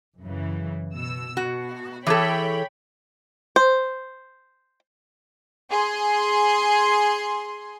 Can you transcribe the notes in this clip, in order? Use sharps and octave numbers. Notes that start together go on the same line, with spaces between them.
F#2 C#3 E3
B2 E6
B2 F#4
E3 G#4 A4 C#5 G5 B5
C5
G#4 C6